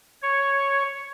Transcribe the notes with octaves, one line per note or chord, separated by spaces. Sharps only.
C#5